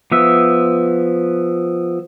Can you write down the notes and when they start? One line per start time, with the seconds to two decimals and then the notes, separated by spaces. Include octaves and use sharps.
0.12 F3 B3 E5